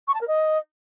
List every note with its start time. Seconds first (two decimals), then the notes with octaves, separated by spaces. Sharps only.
0.07 C#6
0.14 A5
0.21 A#4
0.27 D#5